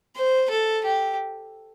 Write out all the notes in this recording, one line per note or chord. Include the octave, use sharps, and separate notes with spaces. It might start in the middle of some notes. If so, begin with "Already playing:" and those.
C5
A4
G4